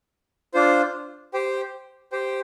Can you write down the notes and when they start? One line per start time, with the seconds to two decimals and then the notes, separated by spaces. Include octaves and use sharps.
0.54 D4 F4 C5
1.34 G4 C5 G5
2.12 G4 C5 G5